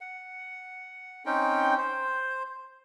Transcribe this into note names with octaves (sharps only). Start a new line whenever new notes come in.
F#5
C4 C#4 D#4 G5
C5